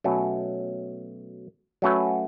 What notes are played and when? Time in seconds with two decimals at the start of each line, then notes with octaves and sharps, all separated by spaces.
0.04 B2 F#3 A3 C#4
1.82 F#3 A3 C#4 F#4 B4